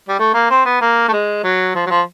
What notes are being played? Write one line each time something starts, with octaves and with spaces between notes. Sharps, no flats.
G3
A3
A#3
C4
B3
A#3
A3
G#3
F#3
F3
F#3
F3